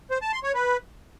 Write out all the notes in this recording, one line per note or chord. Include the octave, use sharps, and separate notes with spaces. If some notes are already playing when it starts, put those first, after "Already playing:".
C5
A5
C6
C#5
B4